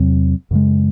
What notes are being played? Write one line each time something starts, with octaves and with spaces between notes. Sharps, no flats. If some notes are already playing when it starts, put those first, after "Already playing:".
Already playing: E2 C3 F#3 C4
F#2 C#3 G#3